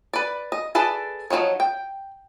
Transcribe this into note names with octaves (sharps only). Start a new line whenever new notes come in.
B4 D5
D#5
G#4 A4 B4 D5 A5
F3 F#3 C4 D#4 C#5
G5